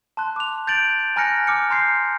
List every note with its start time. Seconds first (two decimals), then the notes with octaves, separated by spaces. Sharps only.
0.17 A5 C6 F#6
0.36 D6 F7
0.67 G6 A6 D7 F#7
1.16 G#5 A#5 F6 F#6 A#6 C#7
1.47 D6 F6 C#7
1.70 A#5 C6 G6 C7